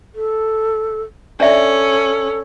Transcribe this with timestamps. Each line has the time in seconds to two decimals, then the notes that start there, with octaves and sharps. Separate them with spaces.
0.15 A4
1.40 C#4 D4 A4 D5 E5